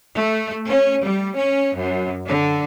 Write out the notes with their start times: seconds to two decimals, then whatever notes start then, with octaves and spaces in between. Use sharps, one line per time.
0.15 A3
0.68 C#4
1.03 G3
1.36 C#4
1.77 F#2
2.27 D3